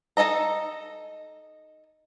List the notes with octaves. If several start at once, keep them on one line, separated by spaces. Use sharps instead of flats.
D#4 F#4 A4 D#5 A#5